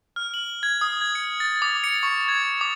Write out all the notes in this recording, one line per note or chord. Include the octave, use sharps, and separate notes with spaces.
F6
F#7
G#6
D#6
G#6
C#7
A6
D6
C#7
C#6
G#6
D6